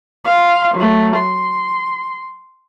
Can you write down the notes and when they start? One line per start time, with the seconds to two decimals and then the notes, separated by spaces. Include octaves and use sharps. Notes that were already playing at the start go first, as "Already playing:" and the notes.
0.25 F5 C6
0.75 F#3 A3
1.17 C6